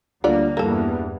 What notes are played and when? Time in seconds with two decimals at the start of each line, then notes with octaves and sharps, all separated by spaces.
0.24 D2 D3 G3 A#3 F4 D5
0.57 E2 G2 A#3 A4